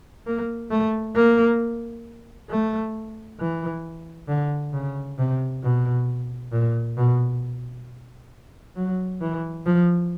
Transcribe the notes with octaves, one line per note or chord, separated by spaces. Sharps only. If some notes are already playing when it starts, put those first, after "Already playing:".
A#3
A3
A#3
A3
E3
D3
C#3
C3
B2
A#2
B2
F#3
E3
F3